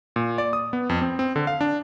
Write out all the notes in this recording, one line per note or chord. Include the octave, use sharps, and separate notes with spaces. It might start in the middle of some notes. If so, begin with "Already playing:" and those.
A#2
D5
D#6
B3
F2
C4
C4
D3
F5
D4